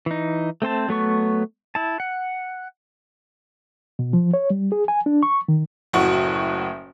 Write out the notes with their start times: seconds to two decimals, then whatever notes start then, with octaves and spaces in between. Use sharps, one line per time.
0.06 E3 D#4
0.62 A3 C4 C5 A5
0.89 F#3 A3 B3 C#6
1.75 E4 A5
2.00 F#5
3.99 B2
4.13 F3
4.34 C#5
4.50 G3
4.72 G#4
4.88 G#5
5.06 D4
5.23 C#6
5.48 D#3
5.93 F#1 A2 F#4